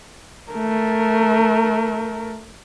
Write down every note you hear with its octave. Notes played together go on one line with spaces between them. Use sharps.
A3 A#4